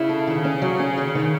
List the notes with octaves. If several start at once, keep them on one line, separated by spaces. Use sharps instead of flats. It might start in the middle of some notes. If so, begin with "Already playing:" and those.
Already playing: C#3 E4
A4
D#3
C#4
F#3
C#4
D#3
D#3